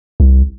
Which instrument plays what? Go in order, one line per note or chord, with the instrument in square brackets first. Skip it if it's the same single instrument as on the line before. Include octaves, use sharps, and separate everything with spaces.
[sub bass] C2